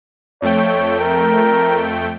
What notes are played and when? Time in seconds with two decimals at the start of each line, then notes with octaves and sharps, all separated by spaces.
0.42 F2 A3 C#5 G5
1.00 A#4